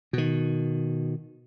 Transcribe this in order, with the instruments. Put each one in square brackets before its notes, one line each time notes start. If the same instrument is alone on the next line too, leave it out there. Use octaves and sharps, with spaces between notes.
[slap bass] B2 D#3